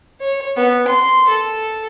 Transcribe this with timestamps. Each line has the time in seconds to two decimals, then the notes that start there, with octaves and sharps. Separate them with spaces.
0.21 C#5
0.56 B3
0.87 C6
1.29 A4